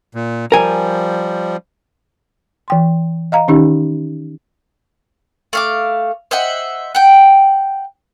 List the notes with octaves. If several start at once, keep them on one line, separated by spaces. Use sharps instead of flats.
A#2
F3 G3 A#4 G#5
E3 G5 C6
D#5 F5 A#5
D#3 C#4 D#4 G4
A3 F5 D6
C5 D#5 E5 F#5
F#5 G5